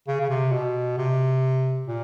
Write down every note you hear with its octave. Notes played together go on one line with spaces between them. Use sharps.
C#3
C#3
C3
B2
C3
A#2